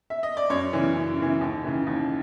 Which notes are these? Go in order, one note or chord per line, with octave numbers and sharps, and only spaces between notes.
E5
D#5
D5
F#2 C#5
C#3 E3
F#2
C#3 E3
D#2
C#3 E3
D#2